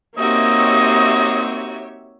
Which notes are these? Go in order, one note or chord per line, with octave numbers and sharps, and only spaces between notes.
A#3 C4 D#4 F#4 G4 C#5 D#5 E5